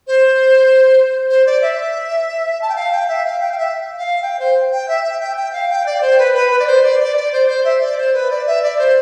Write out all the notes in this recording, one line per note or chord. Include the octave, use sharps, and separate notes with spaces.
C5
C5
D5
E5
A5
G5
F5
G5
E5
F5
G5
F5
E5
F5
G5
C5
G5
E5
E5
G5
G5
F5
G5
D5
C5
B4
B4
B4
D5
C5
D5
D5
D5
C5
C5
E5
D5
C5
B4
D5
E5
D5
C5